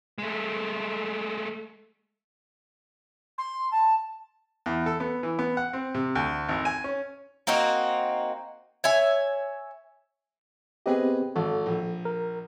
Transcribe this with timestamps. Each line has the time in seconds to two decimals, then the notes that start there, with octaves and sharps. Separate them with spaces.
0.18 G#3 A3
3.38 C6
3.72 A5
4.66 E2
4.86 A4
5.00 B3
5.23 E3
5.39 B3
5.57 F#5
5.73 C4
5.95 C3
6.15 D2
6.49 G#1
6.65 G#5
6.84 C#4
7.47 A#3 C4 D#4 F#4
8.84 C#5 E5 G#5
10.86 B3 C4 G4 G#4 B4 D#5
11.36 G#1 A4
11.66 A#1
12.05 A#4